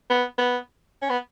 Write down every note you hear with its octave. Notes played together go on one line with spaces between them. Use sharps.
B3
B3
C#4
B3